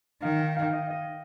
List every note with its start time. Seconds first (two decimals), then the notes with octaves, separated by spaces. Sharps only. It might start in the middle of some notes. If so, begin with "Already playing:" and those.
0.22 D#3 F5
0.39 G5
0.56 F5
0.73 D#5
0.90 D#5